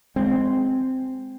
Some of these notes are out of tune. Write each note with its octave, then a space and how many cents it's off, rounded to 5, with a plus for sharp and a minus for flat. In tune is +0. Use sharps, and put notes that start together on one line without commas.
G#3 +0 C4 -10